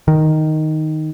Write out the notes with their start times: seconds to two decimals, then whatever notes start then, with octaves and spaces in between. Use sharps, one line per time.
0.08 D#3